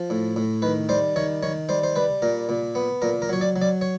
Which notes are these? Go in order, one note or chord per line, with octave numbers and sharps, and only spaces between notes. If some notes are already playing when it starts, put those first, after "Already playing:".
Already playing: F3
A2
A2
D#3 B4
G3 C5
D#3 C#5
D#3 C#5
G3 C5
C5
G3 B4
A#2 A#4
A#2
B3
A#2 A#4
A#4
F#3 C#5
D5
F#3
D5
C#5